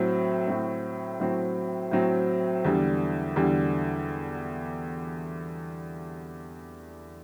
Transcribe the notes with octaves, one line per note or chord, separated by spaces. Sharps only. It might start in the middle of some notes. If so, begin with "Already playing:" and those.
Already playing: A2 F#3 C4
A2 F#3 C4
A2 F#3 C4
A2 F#3 C4
E2 D3 G3
E2 D3 G3